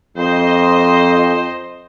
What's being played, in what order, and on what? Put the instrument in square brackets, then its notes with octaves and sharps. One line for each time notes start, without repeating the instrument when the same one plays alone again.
[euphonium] F2 [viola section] C5 D#5